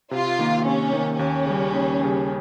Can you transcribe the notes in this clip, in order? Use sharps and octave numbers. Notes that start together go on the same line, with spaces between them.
C3 F4
D#3 A#3
C3 C#4
D#3 A#3
D#2 C#4
C#3 G3
D#2
C#3 G3